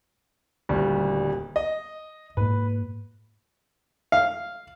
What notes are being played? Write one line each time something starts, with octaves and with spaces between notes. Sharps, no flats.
D#1 D2 G3
D#5
G#2 A#3 B4
F5